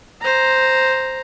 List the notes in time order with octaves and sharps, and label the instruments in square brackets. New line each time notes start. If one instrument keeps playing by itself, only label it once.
[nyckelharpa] C5 A#5